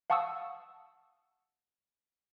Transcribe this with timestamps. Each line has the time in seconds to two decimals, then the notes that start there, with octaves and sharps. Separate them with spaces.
0.10 F5 F#5 A5 C#6 D#6 E6